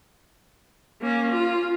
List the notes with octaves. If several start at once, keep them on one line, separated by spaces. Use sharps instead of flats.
A#3 C#4
F4